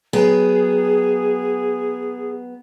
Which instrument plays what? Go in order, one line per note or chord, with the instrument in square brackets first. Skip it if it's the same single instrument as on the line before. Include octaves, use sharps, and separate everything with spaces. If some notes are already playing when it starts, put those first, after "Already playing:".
[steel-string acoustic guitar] F#3 B3 G5 [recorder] G#4